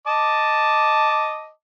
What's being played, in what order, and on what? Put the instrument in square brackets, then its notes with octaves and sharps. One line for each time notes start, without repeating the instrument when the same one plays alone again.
[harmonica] D#5 A5 D6